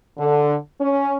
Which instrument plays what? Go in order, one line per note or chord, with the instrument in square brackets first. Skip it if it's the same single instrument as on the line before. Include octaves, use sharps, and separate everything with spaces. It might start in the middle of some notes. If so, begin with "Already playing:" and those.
[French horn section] D3
C#4